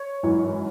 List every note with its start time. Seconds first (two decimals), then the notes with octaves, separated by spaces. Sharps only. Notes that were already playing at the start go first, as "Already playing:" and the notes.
Already playing: C#5
0.23 G#1 F#2 E3